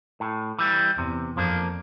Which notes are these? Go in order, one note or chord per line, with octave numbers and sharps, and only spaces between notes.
A2
E3 G3
E2 C3
F2 F3 A#3 D4